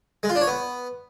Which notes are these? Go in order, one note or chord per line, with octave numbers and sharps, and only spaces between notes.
G#3
F4
D4
C#5
B3